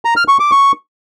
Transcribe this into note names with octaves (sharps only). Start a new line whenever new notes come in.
A#5
F6
C#6
D6
C#6